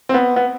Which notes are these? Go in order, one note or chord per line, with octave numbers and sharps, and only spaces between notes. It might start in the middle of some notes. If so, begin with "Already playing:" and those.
C4
B3
B3